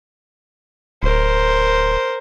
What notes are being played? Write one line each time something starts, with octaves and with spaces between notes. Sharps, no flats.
D1 A#4 C5